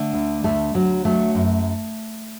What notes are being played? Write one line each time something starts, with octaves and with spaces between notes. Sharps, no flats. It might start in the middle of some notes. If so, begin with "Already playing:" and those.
Already playing: D3 A3
D2
D2 A3
D2 F#3
F#3 A3
F#2